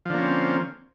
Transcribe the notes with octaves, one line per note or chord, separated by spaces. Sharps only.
D3 F3 A#3 C4 C#4